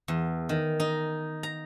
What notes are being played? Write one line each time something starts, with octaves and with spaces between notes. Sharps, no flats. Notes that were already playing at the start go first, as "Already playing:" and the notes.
E2
D#3
D#4
A#5